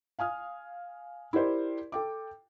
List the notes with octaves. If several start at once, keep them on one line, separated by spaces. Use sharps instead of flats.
F5 G#5 D#6 F6
E4 G4 A#4 C5 D5
A4 G5 D6